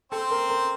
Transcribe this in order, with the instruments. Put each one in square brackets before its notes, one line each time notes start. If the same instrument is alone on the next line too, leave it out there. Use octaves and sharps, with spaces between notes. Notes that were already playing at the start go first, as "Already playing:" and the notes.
[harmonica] C4 C5 [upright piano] A4
[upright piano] A#4
A#4